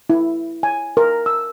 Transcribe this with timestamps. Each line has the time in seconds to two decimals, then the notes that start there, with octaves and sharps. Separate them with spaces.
0.10 E4
0.63 G#5
0.97 A#4
1.26 E6